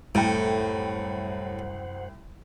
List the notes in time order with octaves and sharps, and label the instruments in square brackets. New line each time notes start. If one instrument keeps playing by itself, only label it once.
[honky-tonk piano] C2 G5 [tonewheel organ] F#2 C5 F#5 [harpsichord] A2 [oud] A3